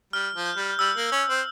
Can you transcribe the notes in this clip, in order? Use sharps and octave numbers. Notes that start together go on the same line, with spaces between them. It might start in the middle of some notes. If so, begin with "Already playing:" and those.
G3 F6
F3
G6
G3
G3 E6
A#3
C#4
C4